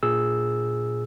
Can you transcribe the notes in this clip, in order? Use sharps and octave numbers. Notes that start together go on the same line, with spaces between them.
A#2 G#4 E6